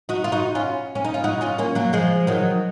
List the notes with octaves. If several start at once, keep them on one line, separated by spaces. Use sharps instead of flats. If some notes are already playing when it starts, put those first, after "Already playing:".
D#4 F#4
F4
D#4 F#4
C#4 F4
C#4
D#4
F4
D#4 F#4
C#4 F4
A#3 C#4
F#3 A#3
F3 G#3
D#3 F#3